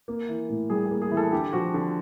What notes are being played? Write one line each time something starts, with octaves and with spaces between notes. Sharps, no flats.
A#3
E3
A2
G3 G#4
G#4
A#3
G#4
E3
A4
D3 G4
F3 F#4
D3